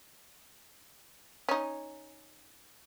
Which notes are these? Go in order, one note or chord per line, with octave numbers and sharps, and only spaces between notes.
C#4 D#4